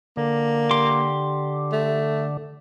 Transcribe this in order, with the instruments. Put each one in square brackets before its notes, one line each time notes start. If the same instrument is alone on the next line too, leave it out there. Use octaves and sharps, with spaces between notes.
[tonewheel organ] D3 [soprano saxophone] A#3
[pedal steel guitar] G4 C6 D6
[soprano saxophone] A3